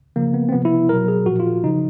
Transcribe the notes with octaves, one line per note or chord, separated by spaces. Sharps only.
C#3 F3 A#3
B3
C4
C3 F3 B3
E4
B2 F#3 A#4
G#4
A#2 F3 F#4
F4
C#3 F3 D#4